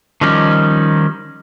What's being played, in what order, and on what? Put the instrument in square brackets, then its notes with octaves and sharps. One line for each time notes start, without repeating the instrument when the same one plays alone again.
[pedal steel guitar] D#3 F3 G3 C#4 D#4